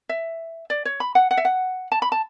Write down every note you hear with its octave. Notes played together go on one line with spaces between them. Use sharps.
E5
D5
C#5
B5
F#5
F#5
E5
F#5
A5
B5
A5